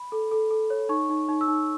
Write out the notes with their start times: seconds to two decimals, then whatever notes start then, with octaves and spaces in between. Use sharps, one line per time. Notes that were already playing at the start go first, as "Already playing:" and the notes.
Already playing: B5
0.12 A4
0.32 A4
0.51 A4
0.70 C#5
0.89 D#4 C#6
1.10 D#4
1.28 D#4
1.41 E6
1.48 D#4